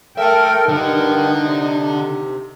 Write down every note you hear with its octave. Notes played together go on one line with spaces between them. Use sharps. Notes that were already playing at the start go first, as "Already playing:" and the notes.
A4 A#4 E5 G5 A5
G2 D3 D#3 D#4
C3